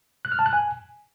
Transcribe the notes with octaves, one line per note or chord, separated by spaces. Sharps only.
F#6
F6
A5
F#6
G#5